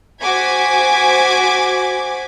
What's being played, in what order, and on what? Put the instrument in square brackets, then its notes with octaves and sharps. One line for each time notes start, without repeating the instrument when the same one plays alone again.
[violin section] F#4 C5 G#5 D6 G#6 B6